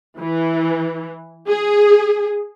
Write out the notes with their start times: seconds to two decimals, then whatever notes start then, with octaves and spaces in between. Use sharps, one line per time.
0.18 E3
1.49 G#4